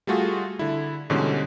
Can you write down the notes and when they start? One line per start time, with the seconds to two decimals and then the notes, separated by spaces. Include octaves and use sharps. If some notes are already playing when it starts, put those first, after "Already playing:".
0.07 G3 A3 F4 F#4 G#4
0.59 D3 E4
1.10 G#2 B2 D3 E3 G3 C#4